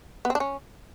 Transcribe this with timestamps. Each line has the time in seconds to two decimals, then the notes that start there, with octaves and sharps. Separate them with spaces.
0.25 B3
0.30 C4
0.35 D4
0.40 C#4